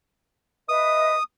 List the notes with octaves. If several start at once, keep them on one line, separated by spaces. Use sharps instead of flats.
B4 D#5 E5 D#6